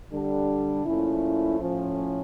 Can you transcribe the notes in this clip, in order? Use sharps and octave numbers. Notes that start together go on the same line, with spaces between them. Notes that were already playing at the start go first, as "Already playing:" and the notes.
D3 G3 D4
A#2 F3 A3 C#4 E4
A2 F3 C#4